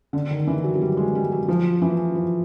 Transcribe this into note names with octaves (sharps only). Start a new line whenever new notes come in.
D3
D#3
E3
F#3
F#3
G3
G#3
G3
F#3
F3
E3
F3